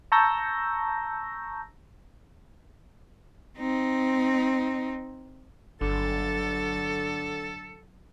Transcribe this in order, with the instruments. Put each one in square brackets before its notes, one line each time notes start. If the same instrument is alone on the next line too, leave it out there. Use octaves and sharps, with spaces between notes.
[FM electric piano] A5 A#5 C#6 E6 G6 A#6
[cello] C4 D#4
[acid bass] G1 [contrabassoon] D3 [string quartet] F#3 A6 [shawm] A4